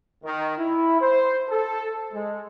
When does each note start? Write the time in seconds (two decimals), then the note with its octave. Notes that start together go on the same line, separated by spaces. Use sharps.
0.24 D#3
0.58 E4
1.01 C5
1.49 A4
2.13 G#3